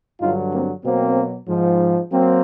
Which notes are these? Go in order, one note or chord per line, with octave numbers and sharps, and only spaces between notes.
G2 D3 F#3 D#4 F4
A#3 C4
B2 F#3 A#3 C4
G#2 F3
F#3 A#3 C4